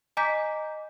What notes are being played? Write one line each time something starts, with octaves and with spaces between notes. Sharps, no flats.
D#5 G#5 A#5 D6 G6 B6